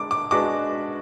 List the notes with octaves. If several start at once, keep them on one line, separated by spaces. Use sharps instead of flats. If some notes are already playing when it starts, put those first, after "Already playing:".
Already playing: G#3 D4 D6
D6
G#3 D4 F#4 B4 D6